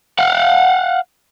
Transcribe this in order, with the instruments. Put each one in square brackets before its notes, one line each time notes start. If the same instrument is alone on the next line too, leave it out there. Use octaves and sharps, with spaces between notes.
[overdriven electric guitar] F5 F#5